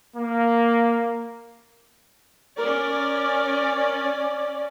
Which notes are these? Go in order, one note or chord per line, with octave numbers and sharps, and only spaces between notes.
A#3
C#4 A#4 D5